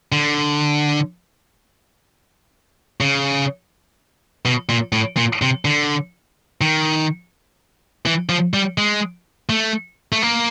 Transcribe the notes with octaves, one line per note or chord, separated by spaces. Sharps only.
D3
C#3
B2
A#2
A2
A#2
C3
D3
D#3
E3
F3
G3
G#3
A3
A3
A#3